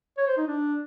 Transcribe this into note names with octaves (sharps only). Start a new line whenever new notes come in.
C#5
C5
D#4
D4